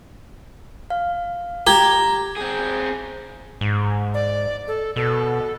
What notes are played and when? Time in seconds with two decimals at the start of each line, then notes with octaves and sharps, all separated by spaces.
0.90 F5
1.67 G4 A#5 G#6
2.37 C4 G#4
3.61 G#2
4.14 D5
4.68 A4
4.96 B2 A4